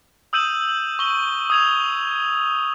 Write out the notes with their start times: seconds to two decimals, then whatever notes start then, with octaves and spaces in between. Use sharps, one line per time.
0.33 D#6 E6 G6 D#7 E7 F#7
0.99 C#6 G7
1.50 D#6 G#6 F7